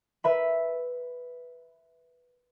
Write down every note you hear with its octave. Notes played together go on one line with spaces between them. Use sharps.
B4 E5 B5